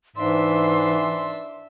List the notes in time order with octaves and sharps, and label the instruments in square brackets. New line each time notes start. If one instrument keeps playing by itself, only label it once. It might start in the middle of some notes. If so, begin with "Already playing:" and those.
[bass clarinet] G#2 [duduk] E3 [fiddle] D4 E5 [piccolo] C6